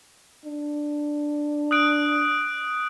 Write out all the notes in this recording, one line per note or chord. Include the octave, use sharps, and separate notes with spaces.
D4
D#6 F#6 D7